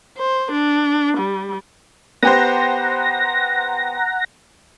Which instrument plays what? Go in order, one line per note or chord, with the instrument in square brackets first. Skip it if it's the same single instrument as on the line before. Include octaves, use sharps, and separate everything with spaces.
[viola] C5
D4
G3
[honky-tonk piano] B3 G4 C5 [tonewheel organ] F#5 A#5 A#6